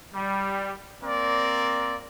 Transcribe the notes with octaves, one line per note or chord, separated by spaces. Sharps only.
G3
A#3 C4 A#4 D5